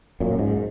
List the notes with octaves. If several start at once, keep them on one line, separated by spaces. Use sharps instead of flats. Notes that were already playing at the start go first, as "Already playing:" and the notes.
F#2 A#2
G#2